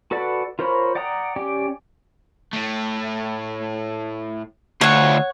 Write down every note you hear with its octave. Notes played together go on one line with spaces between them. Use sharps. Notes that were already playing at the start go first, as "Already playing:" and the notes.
F#4 A4 B4 D5 F#5
F4 A#4 C5 C#5 B5
D5 F#5 G5 A#5 D#6
C#4 G4 D5 G5
A2 A3
D2 F4 A4 C#5 F#5